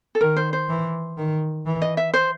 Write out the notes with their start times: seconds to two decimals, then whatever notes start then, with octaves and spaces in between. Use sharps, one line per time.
0.15 A4
0.21 D#3 A#4
0.37 C5
0.53 C5
0.69 E3
1.17 D#3
1.66 E3
1.82 D#5
1.97 E5
2.14 C5